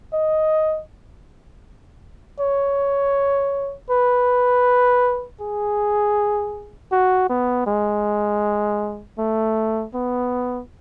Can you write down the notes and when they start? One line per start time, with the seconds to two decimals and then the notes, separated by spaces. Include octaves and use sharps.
0.13 D#5
2.40 C#5
3.90 B4
5.40 G#4
6.92 F#4
7.30 B3
7.67 G#3
9.18 A3
9.94 B3